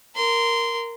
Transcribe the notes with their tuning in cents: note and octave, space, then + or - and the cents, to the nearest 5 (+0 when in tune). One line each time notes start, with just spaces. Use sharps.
A#4 +0 C6 -15